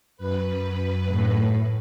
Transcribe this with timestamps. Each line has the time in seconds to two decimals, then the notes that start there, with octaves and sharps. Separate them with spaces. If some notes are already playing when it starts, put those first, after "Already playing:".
0.17 F#2 B4
1.11 A2